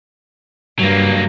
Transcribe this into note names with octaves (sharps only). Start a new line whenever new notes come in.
G2 F#3 A#3